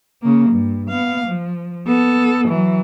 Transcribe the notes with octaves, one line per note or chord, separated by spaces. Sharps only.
C#3 A#3
G2
B3 F5
F3
B3 A4
E3 F#3